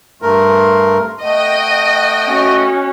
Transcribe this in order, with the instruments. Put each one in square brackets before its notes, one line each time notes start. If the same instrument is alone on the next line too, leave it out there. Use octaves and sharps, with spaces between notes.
[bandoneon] G2 A3 A#4 [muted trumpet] C6
[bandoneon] A3 [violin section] D#5 G5 [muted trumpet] F#5
[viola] C#4 F#4